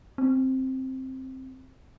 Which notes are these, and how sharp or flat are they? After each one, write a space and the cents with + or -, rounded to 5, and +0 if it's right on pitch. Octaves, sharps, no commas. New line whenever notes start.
C4 +5